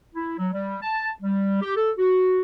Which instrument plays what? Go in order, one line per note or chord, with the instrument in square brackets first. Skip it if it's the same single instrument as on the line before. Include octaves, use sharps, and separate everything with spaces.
[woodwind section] E4
F#3
G3
A5
G3
G4
A4
F#4